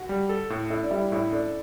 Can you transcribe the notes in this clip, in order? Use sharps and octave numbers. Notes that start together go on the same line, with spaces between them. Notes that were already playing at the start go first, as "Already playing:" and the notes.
Already playing: F#4
G3
A4
A2
E4 A4
D4
G3 E4
A2 E4
D4 A4